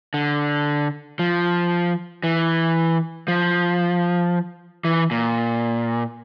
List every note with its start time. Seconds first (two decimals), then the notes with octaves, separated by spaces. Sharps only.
0.14 D3
1.19 F3
2.24 E3
3.28 F3
4.84 E3
5.11 A#2